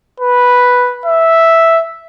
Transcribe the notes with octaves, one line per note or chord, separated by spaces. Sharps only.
B4
E5